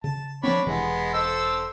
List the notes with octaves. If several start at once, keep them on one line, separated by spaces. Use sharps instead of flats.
C#3 A5
F3 B3 C4 D4 C#5 B5
E1 C3 E3 G#3 B3
A4 C5 E6